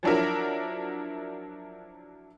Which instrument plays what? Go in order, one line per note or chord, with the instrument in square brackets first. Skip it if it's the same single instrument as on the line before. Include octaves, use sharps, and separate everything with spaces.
[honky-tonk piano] F3 F#3 D4 E4 A#4